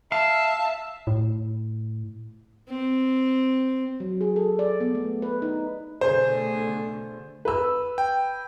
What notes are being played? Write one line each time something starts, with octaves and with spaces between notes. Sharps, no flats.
E5 F5 A5
A2
C4
F#3
G#4
A4
D5
B3
A3
B4
D#4
B2 D3 A3 G#4 C5
B4 E6
G5